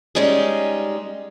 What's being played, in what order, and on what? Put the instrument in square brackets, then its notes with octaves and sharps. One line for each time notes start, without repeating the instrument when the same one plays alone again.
[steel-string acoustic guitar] G3 G#3 C#4 D#4 G#4